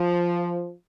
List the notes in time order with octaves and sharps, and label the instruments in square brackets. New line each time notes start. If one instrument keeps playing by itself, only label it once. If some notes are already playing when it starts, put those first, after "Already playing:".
Already playing: [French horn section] F3